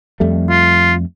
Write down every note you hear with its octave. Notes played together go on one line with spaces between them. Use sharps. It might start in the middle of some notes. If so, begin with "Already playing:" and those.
F2 G3 A3
F4